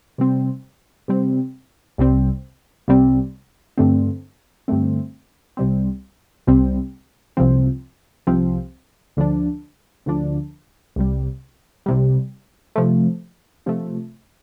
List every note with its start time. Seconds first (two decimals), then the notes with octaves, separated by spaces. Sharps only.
0.18 C3 G3 C4
1.08 C3 G3 C4
1.98 C2 C3 G3 C4
2.88 C2 C3 G3 C4
3.78 G2 D3 A3 C4
4.68 G2 D3 A3 C4
5.57 C2 C3 G3 C4
6.47 C2 C3 G3 C4
7.37 C2 C3 F3 C4
8.27 C2 C3 F3 C4
9.17 D2 D3 F3 D4
10.06 D2 D3 F3 D4
10.96 C2 C3 G3
11.86 C2 C3 G3
12.76 C3 F3 A3
13.66 C3 F3 A3